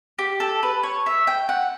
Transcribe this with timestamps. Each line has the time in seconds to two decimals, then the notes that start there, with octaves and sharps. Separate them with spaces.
0.19 G4
0.40 A4
0.63 B4
0.83 C#5
1.06 E5
1.27 G5
1.49 F#5